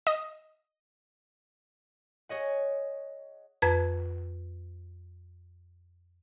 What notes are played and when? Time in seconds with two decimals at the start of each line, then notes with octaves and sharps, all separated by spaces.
0.07 D#5
2.29 G#4 C#5 D#5 F#5
3.62 F2 B4 A#5 G#6